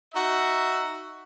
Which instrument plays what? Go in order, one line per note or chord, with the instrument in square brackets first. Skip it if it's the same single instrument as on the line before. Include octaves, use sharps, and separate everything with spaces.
[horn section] D#4 F#4 E5